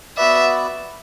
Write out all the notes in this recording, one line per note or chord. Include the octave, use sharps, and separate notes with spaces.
B3 F#4 B4 D5 E5